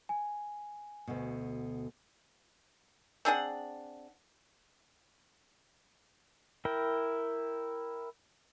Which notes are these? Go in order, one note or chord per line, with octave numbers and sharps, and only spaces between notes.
G#5
D2 B2
C4 D4 G#4 F#5
E4 A#4 G5